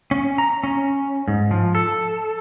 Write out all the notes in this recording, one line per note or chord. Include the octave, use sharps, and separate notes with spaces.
C#4
A#5
C#4
G#2
F3
A4